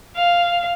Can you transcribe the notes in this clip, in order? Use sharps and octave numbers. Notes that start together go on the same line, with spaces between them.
F5